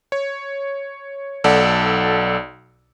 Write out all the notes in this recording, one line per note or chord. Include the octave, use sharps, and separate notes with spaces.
C#5
B1 A4 D5 F#5